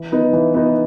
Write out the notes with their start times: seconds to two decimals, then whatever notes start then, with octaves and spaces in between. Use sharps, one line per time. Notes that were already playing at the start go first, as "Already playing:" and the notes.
Already playing: E3
0.12 B3 D#4
0.33 E3
0.54 B3 D#4